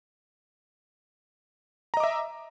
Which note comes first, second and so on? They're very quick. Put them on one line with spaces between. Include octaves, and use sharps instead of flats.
A#5 D#5 D6 E5